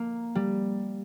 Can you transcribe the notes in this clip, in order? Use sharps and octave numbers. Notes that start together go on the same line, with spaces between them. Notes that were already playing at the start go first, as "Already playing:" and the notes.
Already playing: A#3
G3